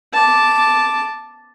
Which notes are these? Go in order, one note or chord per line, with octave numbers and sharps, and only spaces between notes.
A5 D6